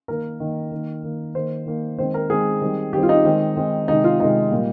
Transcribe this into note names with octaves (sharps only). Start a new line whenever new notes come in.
D#3 A#3 A#4
D#3 A#3
D#3 A#3
D#3 A#3
D#3 A#3 C5
D#3 A#3
D#3 G#3 C4 C5
A#4
D#3 G#3 C4 G#4
D#3 G3 C4
D#3 G3 C4 G4
F4
D#4
D#3 G#3 C4
D#3 G#3 C4
C3 D#3 G#3 D#4
F4
C3 D#3 G#3 D#4
A#2 G3 A#3